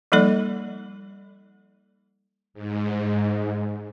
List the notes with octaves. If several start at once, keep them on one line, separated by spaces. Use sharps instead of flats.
F3 G3 A#3 D#4 A4 D5
G#2